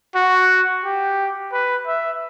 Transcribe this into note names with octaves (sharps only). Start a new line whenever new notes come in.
F#4
G4
B4
E5